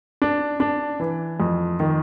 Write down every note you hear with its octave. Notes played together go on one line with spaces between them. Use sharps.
D4
D4
E3
F2
D#3